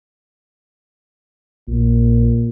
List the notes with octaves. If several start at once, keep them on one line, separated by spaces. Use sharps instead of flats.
A#1 A#2